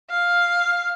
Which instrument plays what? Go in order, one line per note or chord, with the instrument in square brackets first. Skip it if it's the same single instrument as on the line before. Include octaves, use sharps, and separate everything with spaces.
[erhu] F5